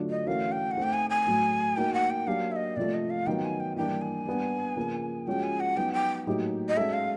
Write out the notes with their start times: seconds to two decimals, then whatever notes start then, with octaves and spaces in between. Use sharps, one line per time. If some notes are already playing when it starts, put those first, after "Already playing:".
Already playing: D3 F#3 A3 D4 F4
0.10 D#5
0.27 E3 A3 C#4 F#4 A#4 F5
0.52 G5
0.71 F#5
0.77 A3 C4 D#4
0.83 G5
0.93 G#5
1.10 G#5
1.27 A2 F#3 A3
1.77 A#3 D#4 F#4 A#4 G5
1.94 F#5
2.10 G5
2.27 F#3 A#3 D4 G4 F5
2.52 E5
2.56 D#5
2.76 C3 F3 A3 D5
2.94 D#5
3.10 F5
3.27 D#3 F#3 B3 G5
3.44 G#5
3.60 G5
3.76 E3 G3 A#3 D4 G5
4.01 G#5
4.26 G3 B3 D4
4.76 C#3 F3 A#3
5.27 F3 G#3 C#4 F#4 G5
5.43 G#5
5.60 F#5
5.76 F#3 B3 D#4 G5
5.93 G5
6.27 A2 F#3 A#3 D#4 G4
6.69 D#5
6.77 G#3 C#4 F#4 A4 E5
6.93 F5